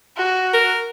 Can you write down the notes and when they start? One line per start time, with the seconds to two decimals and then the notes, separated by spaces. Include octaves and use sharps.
0.17 F#4
0.54 A#4